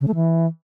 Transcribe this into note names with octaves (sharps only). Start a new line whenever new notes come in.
C#3
A3
E3